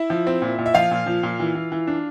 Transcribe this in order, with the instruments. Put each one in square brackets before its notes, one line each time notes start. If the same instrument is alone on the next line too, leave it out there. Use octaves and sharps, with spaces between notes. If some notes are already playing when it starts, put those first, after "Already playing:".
Already playing: [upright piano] E4 E5
F3
C4
A#2
A#2
E5
F3 F4 F5
A#2
F3
A#2
E3
E3
E3
D4